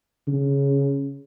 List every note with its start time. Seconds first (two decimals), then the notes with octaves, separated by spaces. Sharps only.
0.28 C#3